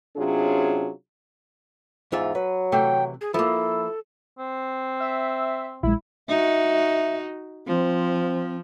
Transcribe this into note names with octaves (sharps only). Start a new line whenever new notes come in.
C3 F#3 C#4 D4 F4 G#4
E2 G#2 F4 E5
F#3 B4
C3 E3 A3 G5
G#4
F3 A#3 E4 A4
C4
E5
A#1 G#3 E4
D#4 F#4 E5
F3 C4